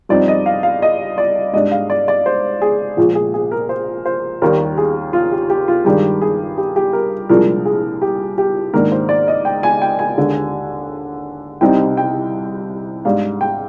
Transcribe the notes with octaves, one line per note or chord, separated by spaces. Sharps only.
G2 F3 C4 D#4 D5
D#5
F5
F5
D#5
D5
G#2 G3 D4 D#5
F5
D5
D5
C5
G#4
A#1 A#2 F3 G#3
G#4
G#4
A#4
C5
C5
D#2 D#3 G3 A#4
G#4
F4
G4
G4
F4
G2 D#3 G#3 D4 G4
G#4
G4
G4
A#4
C2 A#2 F3 G#3 D4 A#4
G#4
G4
G4
G#2 D#3 A#3 D4 A#4
C5
D5
D#5
G5
G#5
G5
G#5
D#2 D3 G#3
C2 C3 G3 C4 D#4 G5
G5
G#2 G3 D4 F5
G5